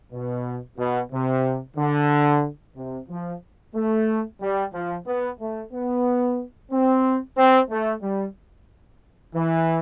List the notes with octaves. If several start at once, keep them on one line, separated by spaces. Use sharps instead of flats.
B2
B2
C3
D3
C3
F3
A3
G3
F3
B3
A3
B3
C4
C4
A3
G3
E3